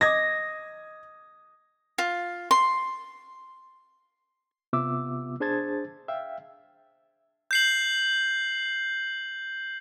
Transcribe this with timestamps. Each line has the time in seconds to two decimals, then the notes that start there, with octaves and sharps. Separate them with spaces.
0.01 D#5 D6 D#6 G#6 A#6
1.98 F4
2.51 C6
4.73 C3 B3 F4 E5 D6 E6
5.40 D4 G#4 C5 A5 G#6 A6
6.08 E5 F5 G5
7.51 G6 C7 F#7